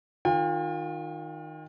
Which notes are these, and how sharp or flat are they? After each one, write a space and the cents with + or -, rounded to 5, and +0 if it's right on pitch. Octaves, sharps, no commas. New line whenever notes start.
D#3 +0 F4 +30 G5 +45